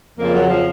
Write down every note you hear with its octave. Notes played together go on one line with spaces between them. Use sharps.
F2 C#3 F3 A#3
F#3
F3